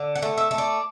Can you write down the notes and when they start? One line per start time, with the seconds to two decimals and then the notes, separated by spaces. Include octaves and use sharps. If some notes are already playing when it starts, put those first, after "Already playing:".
Already playing: D3
0.16 F#5
0.22 A3
0.38 E5
0.51 A3
0.58 D5